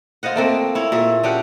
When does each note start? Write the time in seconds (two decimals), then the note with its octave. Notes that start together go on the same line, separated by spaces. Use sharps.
0.23 F4 C5 D#5 F#5
0.36 A3 A#3 C4
0.75 E4 C#5
0.92 A#2 G#4 E5
1.23 C#4 D4 G4 F#5